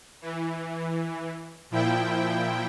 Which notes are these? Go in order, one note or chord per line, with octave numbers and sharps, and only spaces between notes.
E3
A#2 F3 E4 G5